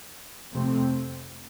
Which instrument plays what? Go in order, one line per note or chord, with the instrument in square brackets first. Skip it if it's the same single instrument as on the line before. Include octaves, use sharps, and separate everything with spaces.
[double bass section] F2 C3 A3 C4